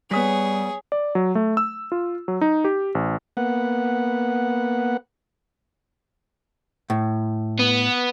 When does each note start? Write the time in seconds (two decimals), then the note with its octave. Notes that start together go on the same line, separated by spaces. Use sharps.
0.11 G3 B3 G#4 C#5 D#6 B6
0.92 D5
1.15 F#3
1.35 A3
1.57 E6
1.92 F4
2.28 F#3
2.41 D#4
2.65 G4
2.95 A1
3.37 A#3 B3 F#5
6.90 A2
7.59 B3